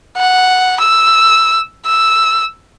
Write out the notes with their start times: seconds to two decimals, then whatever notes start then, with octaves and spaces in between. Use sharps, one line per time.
0.17 F#5
0.80 E6
1.86 E6